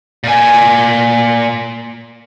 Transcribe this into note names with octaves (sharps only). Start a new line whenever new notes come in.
A#2 G#5